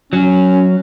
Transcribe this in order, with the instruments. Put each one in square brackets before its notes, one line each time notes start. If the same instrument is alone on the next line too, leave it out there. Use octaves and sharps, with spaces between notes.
[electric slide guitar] F#3 [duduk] C#4